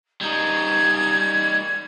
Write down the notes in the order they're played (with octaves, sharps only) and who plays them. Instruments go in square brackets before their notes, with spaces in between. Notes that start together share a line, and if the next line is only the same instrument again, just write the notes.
[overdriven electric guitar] G3 D#4 [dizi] G#6